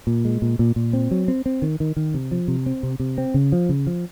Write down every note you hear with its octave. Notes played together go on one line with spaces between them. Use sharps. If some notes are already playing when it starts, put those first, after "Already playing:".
A#2
G#3
A#2
A#2
A#2
C4
F#3
C4
C4
D#3
D#3
D#3
C3
F3
C3
C4
C3
C3
C4
C#3
F3
C#3
F3